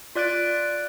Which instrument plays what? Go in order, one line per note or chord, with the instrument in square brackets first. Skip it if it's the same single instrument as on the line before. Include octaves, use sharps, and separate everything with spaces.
[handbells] F4 D5 F#6 A6 D7